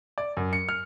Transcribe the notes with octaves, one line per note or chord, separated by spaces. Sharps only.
D5
F#2
C#7
F6